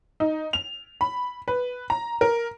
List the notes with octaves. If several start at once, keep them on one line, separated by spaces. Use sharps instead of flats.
D#4
F7
B5
B4
A#5
A#4